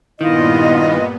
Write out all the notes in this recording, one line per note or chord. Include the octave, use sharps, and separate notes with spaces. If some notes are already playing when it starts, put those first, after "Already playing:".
G2 A#2 D#3 B3 E4 F4 D#5